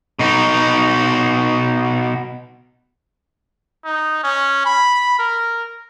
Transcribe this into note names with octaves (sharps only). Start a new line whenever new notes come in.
B2 D#4
D#4
C#4
B5
A#4